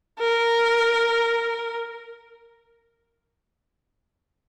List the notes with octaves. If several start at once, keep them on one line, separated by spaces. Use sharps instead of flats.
A#4